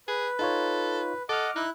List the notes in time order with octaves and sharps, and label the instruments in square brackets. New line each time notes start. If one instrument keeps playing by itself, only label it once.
[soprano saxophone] G#4 [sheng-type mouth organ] B4
[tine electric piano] D#4 F4 C#5 [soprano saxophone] A4
[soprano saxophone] A4 [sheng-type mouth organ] D#5 F#5 [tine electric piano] D6 F6
[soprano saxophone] D#4 [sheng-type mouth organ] E4 F#6